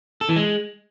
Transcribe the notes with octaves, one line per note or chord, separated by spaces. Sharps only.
A4
E3
G#3